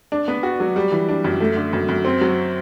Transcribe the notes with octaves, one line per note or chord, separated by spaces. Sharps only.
D4
B3
F#4
F#3
G3
E3
D4
F#2
A3
D3
F#2
F#2
C4
F#3